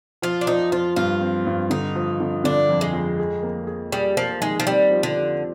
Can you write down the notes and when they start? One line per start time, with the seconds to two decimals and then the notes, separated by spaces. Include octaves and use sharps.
0.22 F3 F4
0.41 D4
0.47 F3 D#4
0.72 F3 F4
0.96 G2 F4
1.21 C4
1.47 G2
1.70 D3 D#4
1.95 F3
2.20 D3
2.44 D3 D4
2.69 F2
2.81 G#3
2.93 F2
3.19 G#4
3.43 A#3
3.67 G#4
3.92 G3 G#4
4.17 F3 A#3
4.42 D#3 G#3
4.60 F3
4.67 G3 C4
4.91 F3
5.03 D3
5.15 G4